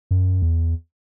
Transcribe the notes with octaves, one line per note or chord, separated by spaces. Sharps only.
F#2
E2